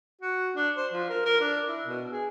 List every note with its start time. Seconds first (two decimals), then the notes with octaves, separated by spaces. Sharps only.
0.21 F#4
0.56 D4
0.77 C5
0.93 F3
1.09 A#4
1.25 A#4
1.41 D4
1.68 E4
1.86 B2
2.10 G#4